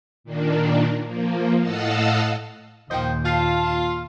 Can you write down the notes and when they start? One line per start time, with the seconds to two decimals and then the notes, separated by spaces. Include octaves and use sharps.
0.24 A#2 D#3 A#3 D4
1.05 F3 A#3
1.61 A2 D#5 F5 F#5 A5 E6
2.91 D#2 A#2 D#3 F3 C5 D#5 G5
3.25 F4 F5 A5